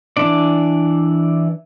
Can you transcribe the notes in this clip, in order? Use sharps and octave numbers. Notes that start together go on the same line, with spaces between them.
E3 D4 D5